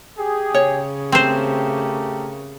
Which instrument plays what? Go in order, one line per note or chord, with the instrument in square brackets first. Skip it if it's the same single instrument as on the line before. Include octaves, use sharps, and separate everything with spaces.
[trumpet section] G4 G#4
[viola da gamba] C#3 [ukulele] C#5
[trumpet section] A3 G4 A#4 [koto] C4 C5